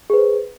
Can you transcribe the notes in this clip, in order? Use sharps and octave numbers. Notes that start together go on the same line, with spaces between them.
G#4 B4 C5